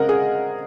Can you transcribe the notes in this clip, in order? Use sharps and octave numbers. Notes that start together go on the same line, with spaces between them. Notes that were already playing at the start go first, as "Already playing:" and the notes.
Already playing: C#3 G#3 C4 A#4 D#5 F#5
G#4